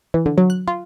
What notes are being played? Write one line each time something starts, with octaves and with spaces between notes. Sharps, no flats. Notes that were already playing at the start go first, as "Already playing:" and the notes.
E3
D3
F#3
F#6
F4